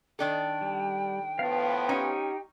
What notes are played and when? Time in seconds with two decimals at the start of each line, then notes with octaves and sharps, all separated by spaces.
0.19 D#3 D4 A4 G5
0.61 G3
1.39 A2 F3 B3 F5 A5
1.89 C#4 D#4 G4